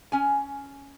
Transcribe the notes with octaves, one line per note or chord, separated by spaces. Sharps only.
C#4 G#5